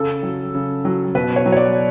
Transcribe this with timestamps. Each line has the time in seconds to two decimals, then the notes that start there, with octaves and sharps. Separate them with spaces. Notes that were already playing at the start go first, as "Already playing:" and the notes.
Already playing: C#3 A4
0.23 F#3
0.54 C#3
0.85 F#3
1.15 B2 B4
1.36 C#5
1.46 F#3
1.52 C#5
1.57 D5